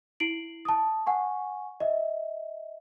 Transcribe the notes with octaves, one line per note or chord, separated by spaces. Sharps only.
E4 C7 D7 F#7
A5 D#6
F#5 G#5 C#6
D#5 E5